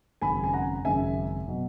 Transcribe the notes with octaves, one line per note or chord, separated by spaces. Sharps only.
G#1 F#2 C#3 G#5 B5
G#5
F#5 A#5
G#1 F#2 C#3 E5 G#5
B2 F#3